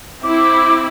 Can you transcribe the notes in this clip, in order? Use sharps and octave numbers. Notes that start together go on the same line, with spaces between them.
C4 E4 D6